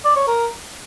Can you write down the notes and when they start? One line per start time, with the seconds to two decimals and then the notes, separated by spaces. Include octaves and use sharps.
0.05 D5
0.16 C#5
0.28 A#4